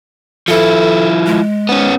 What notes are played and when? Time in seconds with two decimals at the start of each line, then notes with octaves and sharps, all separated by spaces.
0.48 F3 E4 A4
1.26 G#3
1.69 B3 C#4